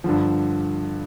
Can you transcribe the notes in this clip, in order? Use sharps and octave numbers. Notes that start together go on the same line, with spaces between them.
G2 D3 F3